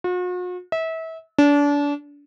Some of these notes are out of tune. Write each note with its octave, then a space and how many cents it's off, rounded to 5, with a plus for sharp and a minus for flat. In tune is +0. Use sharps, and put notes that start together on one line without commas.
F#4 -45
E5 -30
D4 -30